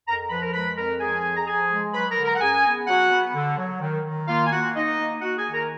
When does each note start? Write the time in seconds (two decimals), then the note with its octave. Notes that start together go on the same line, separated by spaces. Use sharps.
0.07 F2 A#4 A#5
0.30 F3 B4 B5
0.42 A#4 A#5
0.53 G#3 B4 B5
0.77 F2 A#4 A#5
1.00 F3 G#4 G#5
1.24 F2
1.37 A#5
1.47 F3 G#4 G#5
1.71 G#3
1.94 F#3 B4 B5
2.10 A#4 A#5
2.18 D3
2.25 A#4 A#5
2.36 F#5
2.41 F#2 G#4 G#5
2.65 B3
2.87 F#3 F#4 F#5
3.11 B3
3.35 D3
3.58 F#3
3.81 D#3
4.04 D#3
4.28 A#3 F4 F5
4.47 G#5
4.52 A#3 F#4 F#5
4.75 A#3 D#4 D#5
4.99 A#3
5.21 A#3 F#4 F#5
5.38 G#4 G#5
5.45 D#3
5.53 A#4 A#5